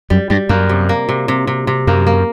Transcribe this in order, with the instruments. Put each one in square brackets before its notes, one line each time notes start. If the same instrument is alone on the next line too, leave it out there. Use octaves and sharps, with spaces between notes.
[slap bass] F#2 [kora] G3
[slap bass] G2 [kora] G3
[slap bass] F#2 [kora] A#3
[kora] C3
A#3
C3
C3
C3
C3
[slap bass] F#2 [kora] A#3
[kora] A#3